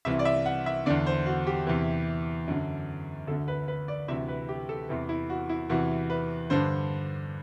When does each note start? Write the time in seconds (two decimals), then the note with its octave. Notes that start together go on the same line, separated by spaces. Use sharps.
0.05 C2 C3 E3 E5
0.19 D5
0.25 E5
0.46 F#5
0.66 E5
0.86 E2 D3 D5
1.06 C5
1.26 F#4
1.47 G4
1.67 E2 C3 E3
2.48 F#2 D3
3.27 D2 A4
3.31 D3
3.48 B4
3.68 B4
3.88 D5
4.08 D2 C3 E3 E5
4.28 B4
4.49 G4
4.69 A4
4.89 E2 C3 E3
5.09 E4
5.30 F#4
5.49 E4
5.69 E2 C3 E3 F#4
6.10 B4
6.50 G2 D3 C5